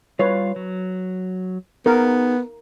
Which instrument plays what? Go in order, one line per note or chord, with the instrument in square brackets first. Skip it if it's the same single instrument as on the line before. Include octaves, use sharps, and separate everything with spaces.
[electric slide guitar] G3 F4 F5 [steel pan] B4 C#5
[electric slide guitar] F#3
[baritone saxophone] B3 [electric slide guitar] D#4 G#4 [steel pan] A#4